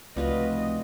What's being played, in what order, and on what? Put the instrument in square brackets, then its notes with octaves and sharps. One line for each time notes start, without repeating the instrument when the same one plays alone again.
[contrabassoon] F1 [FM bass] C#2 [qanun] G3 F4 F#4 [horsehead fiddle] B4 D#5